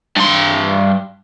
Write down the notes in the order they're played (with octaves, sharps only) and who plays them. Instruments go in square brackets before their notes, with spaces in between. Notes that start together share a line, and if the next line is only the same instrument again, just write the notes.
[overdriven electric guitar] G2 C6